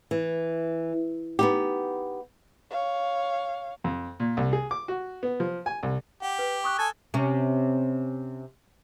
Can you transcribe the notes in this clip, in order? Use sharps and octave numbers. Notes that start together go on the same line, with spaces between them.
E3
B3 D#4 G4
C#5 F5
F2
A#2
C2
G#4
D6
F#4
B3
F3
G#5
C2
G4 F#5
B4
C#6 D#6 F#6
A4 G#5 A6
C3 C#4